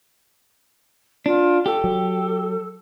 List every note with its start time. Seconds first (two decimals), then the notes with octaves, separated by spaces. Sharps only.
1.26 D4 F4
1.66 G4 A4
1.84 F#3